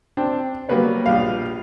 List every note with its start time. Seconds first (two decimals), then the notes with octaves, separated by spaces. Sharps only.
0.17 C4 D4 G5
0.69 F#3 G3 A#3 B3 B4 C#5
1.06 A#1 G3 F5